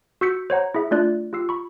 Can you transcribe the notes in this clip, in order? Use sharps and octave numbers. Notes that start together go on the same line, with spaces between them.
F#4 C#6 E6 G6 B6 C#7
C5 C#5 F#5 A#5
E4 G#4 E5
A3 D4 F4 D5 A5 F#6
F4 G4 E6 C7
B5 C#6